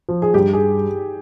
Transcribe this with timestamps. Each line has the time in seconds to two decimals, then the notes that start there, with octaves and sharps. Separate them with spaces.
0.09 F3
0.22 G#4
0.34 G2 G4
0.53 G#4